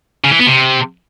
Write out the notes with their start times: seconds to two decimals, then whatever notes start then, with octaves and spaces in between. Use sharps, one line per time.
0.24 C#3
0.32 E3
0.39 B3
0.47 C3